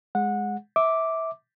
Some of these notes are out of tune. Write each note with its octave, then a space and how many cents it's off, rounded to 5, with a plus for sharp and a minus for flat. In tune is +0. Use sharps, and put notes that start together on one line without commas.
G#3 +0 F#5 -20
E5 -20 D6 +0